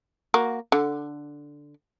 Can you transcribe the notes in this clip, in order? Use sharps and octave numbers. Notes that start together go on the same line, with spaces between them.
A#3 F#4
D3